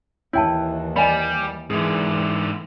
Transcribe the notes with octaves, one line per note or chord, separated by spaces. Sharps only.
D#2 E3 E4 C#5 G5 A5
G3 D5 D#5 G#5 B5
G#2 D3 E3 G#4